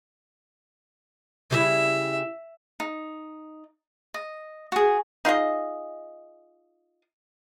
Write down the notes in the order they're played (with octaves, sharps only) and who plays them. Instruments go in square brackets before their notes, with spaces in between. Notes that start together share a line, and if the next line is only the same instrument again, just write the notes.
[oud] C#3 G3 E4 [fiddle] E5
[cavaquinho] D#4
D#5
F#4 G#4
[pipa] D#4 F4 G#4 D#5